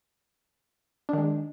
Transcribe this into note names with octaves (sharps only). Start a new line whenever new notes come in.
D#3 G#3 D4